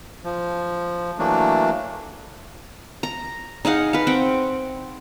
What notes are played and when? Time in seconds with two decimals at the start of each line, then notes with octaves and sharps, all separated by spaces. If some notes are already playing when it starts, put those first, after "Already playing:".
0.24 F3
1.19 E3 F#3 A3 A#3 D4
3.03 A#5
3.65 D#4 G#4 F5 F#5
3.93 B4 F5
4.07 C4 F#5 G5